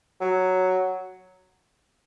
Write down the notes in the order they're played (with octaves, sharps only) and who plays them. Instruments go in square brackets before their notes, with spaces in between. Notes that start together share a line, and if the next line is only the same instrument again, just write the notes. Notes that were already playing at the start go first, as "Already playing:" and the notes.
[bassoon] F#3